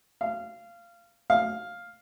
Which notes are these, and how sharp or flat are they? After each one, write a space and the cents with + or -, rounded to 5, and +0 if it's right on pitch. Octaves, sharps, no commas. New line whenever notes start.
F5 -20
F5 +5